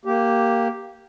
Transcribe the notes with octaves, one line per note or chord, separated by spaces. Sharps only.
A#3 G4